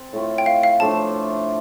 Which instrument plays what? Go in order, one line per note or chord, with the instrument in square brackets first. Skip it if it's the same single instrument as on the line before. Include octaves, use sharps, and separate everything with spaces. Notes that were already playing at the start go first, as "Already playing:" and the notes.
Already playing: [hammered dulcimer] C4 A4
A2 A3 F4
[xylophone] G5
F5
F5
[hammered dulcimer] A2 F3 A3 D4 [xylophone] A5